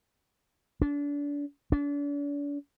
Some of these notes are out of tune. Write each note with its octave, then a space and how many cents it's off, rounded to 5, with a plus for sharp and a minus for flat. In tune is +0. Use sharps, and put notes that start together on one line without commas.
D4 -30
D4 -40